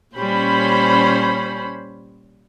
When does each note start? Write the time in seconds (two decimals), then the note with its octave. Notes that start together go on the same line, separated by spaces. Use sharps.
0.16 A#2 G3 C#4 C5 B5